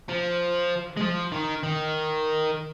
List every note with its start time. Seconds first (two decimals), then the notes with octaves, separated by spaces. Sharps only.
0.09 F3
0.97 G#3
1.01 F3
1.32 D#3
1.63 D#3